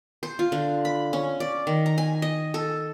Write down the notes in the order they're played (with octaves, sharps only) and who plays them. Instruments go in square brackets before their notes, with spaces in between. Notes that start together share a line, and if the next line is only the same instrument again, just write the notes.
[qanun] C5
F4
D3
B5
C#4
D5
D#3
A#5
G#5
D#5
A4